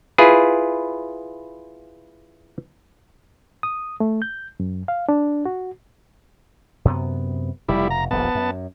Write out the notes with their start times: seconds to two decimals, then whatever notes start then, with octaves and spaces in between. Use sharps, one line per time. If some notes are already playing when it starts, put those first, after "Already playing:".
0.18 E4 F4 G#4 B4
3.63 D#6
4.00 A3
4.22 G6
4.60 F#2
4.88 F5
5.09 D4
5.45 F#4
6.85 F#2 C3 B3
7.69 F1 B2 G3 E4
7.90 A#5
8.11 D#1 A#1 F2 B3 A5
8.35 F#2